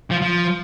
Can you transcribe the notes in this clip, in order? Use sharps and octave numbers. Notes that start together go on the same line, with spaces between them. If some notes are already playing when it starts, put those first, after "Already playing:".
F3
F3